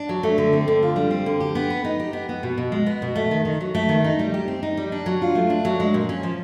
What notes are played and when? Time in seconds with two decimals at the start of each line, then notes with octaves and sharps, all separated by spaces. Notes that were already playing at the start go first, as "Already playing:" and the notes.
Already playing: D4
0.09 F#3
0.23 A3
0.38 D3
0.53 C4
0.68 D3
0.82 F4
0.96 G3
1.11 C4
1.26 D3
1.40 G4
1.55 B3
1.70 B4
1.84 D#4
2.00 G4
2.13 B3
2.29 B3
2.43 B2
2.58 B2
2.72 G#3
2.86 B3
3.02 B2
3.16 A3
3.31 D#3
3.45 D#3
3.61 F#3
3.75 A3
3.89 D#3
4.04 D#4
4.19 G3
4.34 G4
4.48 C4
4.63 D#4
4.77 G3
4.92 D4
5.06 F#3
5.22 F4
5.35 A3
5.50 D4
5.65 F#3
5.80 G#3
5.94 A#2
6.09 C#4
6.23 F3